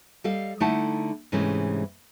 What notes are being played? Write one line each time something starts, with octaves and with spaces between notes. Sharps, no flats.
G3 A4 D#5 F5
D3 A3 D#4 E4 F#5 A5
G#2 C3 E3 G#3 A3 C#4